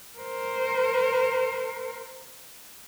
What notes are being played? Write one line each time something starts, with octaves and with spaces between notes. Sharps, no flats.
A#4 C5